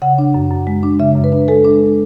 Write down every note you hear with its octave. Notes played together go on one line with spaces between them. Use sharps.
C#3 F#5
D4
F#2
F#2
G#3
D4
C#3 E5
F#2
B4
D4
G#3 A4
D4